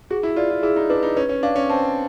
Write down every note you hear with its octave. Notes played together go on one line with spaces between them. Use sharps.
F#4 G#4
E4
F4 D5
F4
E4 G#4
D#4
D4 B4
D#4
C#4 B4
C#4
D4 F5
C#4
C4 A5